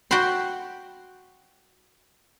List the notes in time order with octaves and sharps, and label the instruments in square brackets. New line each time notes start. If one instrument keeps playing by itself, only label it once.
[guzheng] F#4 G5 A5 B5 C6